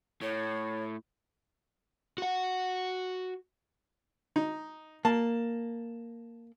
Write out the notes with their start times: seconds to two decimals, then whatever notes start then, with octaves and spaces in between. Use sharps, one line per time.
0.22 A2 C#5
2.18 F#4 F#5
4.36 D#4
5.05 A#3 A5